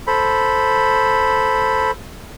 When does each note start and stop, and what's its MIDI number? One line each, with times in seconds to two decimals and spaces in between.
0.07 1.91 69
0.07 1.91 72
0.07 1.91 83